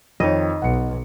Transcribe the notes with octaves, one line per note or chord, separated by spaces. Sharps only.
F2 D#3 D#4 C#5 D#5
B1 F#5 C#7